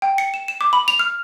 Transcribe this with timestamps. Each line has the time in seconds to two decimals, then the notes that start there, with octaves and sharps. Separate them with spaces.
0.02 G5
0.18 C#7
0.34 E7
0.48 E7
0.61 D6
0.73 B5
0.88 F7
0.99 F6